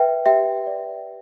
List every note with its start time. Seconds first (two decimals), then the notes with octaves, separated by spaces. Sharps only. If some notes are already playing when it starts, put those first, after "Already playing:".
Already playing: B4 E5 G5
0.26 G4 E5 G5
0.67 D5